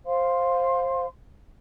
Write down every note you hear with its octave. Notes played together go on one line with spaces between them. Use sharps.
C5 F5 C6